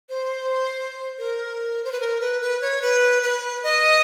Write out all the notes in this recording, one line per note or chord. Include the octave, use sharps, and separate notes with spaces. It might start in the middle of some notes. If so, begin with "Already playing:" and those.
C5
A#4
C5
B4
A#4
B4
B4
C#5
B4
B4
D#5